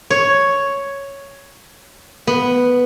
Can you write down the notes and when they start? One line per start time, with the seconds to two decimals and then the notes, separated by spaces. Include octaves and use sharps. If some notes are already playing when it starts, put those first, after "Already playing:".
0.10 C#5
2.27 B3